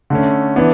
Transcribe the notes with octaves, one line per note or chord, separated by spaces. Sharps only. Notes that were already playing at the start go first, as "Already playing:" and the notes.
D3 A3 C#4
E3 B3 D4